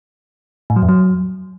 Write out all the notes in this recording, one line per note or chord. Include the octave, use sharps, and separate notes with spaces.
A2
F#3
F2
F#3